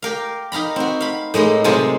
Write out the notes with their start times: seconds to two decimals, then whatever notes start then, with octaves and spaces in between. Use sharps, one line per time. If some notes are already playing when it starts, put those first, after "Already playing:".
0.02 G4 A#4 F5
0.52 D#4 F5 A#5 B5
0.76 C4 F#4
1.01 F5 B5
1.34 A2 G#3 A#3 D#4
1.64 C3 F#3 G#3 F4 C5 A5